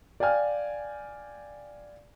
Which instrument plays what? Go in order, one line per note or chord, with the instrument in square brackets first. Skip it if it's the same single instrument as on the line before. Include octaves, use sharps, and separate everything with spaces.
[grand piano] D5 F5 G5 G#5 F6